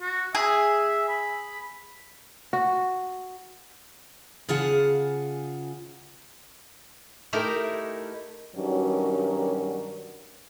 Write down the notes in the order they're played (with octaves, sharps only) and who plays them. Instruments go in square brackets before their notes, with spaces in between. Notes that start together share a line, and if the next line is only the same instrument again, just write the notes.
[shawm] F#4
[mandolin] G#4 [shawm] E5
[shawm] B5
[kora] F#4
[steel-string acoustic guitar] C#3 F4 G#4 F#5 A5
[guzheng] A3 D#4 E4 G4 A#4
[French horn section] G2 D#3 F#3 C#4 F#4 A#4